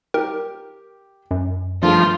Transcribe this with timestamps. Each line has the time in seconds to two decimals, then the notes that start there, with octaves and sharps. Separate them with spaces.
0.14 G4 A#4
1.31 F#2
1.83 G2 F3 A3 F4 G#4